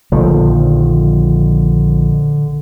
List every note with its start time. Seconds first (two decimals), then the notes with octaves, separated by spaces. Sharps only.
0.12 A#1 D3 D#3 F3